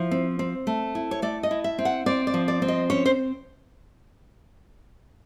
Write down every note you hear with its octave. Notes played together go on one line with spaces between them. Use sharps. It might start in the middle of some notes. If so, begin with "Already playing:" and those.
Already playing: F3 E4
C4
C4
A3
E4
C#5
A3 D5
D#5
E4
E5
C4
F#5
C4 D5
D5
F3
D5
C4
D#5
C#4 C#5
C5